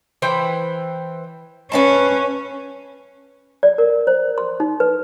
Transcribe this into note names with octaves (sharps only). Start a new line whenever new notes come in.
E3 C5 G5
C#4 B4 F5 A5
D5
A#4
C5
C6
D#4
B4